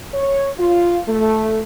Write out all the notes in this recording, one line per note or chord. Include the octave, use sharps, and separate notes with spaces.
C#5
F4
A3